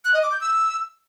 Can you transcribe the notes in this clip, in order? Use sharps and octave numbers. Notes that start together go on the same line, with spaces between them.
F#6
D#5
D6
G6
E6